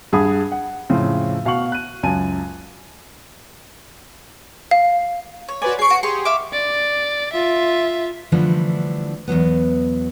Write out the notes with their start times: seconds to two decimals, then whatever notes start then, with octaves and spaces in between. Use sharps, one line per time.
0.13 G2 G#4 F#5 B5 D#6
0.52 F#5
0.89 F2 A2 C#3 C4
1.45 B2 F5 F#5 C#6 F#7
1.72 F#6 D#7
2.03 C#2 F#2 G#5 A5 D#7
4.71 F5
5.49 C#5
5.62 F#4 B4 D5 G#5 C6
5.79 G#4 C#6 C7 D7
5.90 F#4
6.03 G4 G#4 C6 C#6
6.25 E5 F5 D6
6.53 D5
7.33 F4 E5
8.32 D3 E3 F3 G3 A3 D4
9.28 E2 G2 F#3 B3